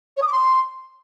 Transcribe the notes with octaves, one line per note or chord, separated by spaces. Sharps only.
C#5
D#6
D6
C6